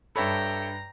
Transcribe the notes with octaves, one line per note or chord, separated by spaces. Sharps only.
G2 A4 C#5 E5 G5 A#5 B5